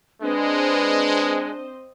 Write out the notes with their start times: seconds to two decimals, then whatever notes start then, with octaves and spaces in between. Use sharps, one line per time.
0.22 G#3 C4 D4 B4 C5 D5 D#5